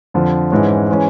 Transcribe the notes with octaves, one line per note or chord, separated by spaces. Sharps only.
F2 D3 F3
G#2 E3 G#3 C#4
E3 G#3 C#4